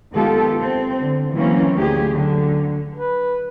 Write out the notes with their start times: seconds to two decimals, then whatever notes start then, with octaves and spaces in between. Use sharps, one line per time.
0.12 D#3 G#3 B3 F4 G4 A4
0.59 C4
0.98 D3
1.33 E3 F#3 A#3 C4 C#4
1.77 D2 G4 G#4
2.10 D3 F#3
2.93 B4